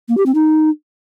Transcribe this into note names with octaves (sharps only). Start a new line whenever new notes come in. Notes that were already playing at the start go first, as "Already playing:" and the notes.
A#3
G4
C4
D#4